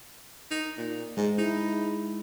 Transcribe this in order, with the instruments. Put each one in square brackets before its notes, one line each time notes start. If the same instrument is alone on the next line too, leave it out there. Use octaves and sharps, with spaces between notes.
[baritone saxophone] D#4
A#2
[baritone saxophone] G#2 [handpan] G#3
[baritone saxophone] D#4 [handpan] E4